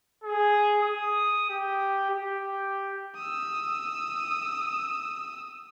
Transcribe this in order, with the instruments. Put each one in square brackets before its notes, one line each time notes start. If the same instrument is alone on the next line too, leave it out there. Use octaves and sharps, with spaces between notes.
[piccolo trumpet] G#4
D#6
G4
G4
[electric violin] D#6 E6